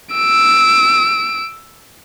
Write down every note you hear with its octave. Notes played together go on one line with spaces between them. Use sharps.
E6 D7